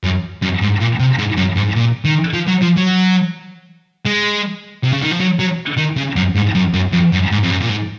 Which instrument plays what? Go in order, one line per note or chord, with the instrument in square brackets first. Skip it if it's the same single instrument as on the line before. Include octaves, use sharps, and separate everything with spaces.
[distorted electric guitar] F#2
F#2
G#2
A#2
C3
G#2
F#2
G#2
A#2
D#3
F3
F#3
F3
F#3
G#3
C3
C#3
D#3
F3
F#3
F#3
D#3
C#3
F#2
G#2
F#2
F#2
F2
F#2
G#2
F2
F#2
A#2
G#2